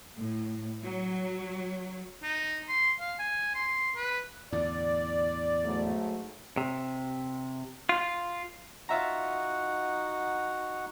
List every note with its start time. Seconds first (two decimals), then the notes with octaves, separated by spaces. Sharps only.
0.17 A2
0.81 F#3
2.23 D#4
2.69 C6
3.00 F5
3.19 G#5
3.55 C6
3.96 B4
4.52 E2 A2 D3 D5
5.64 G#2 F#3 A3
6.57 C3
7.89 F4
8.89 D#4 F4 F#4 E5 F#5 A#5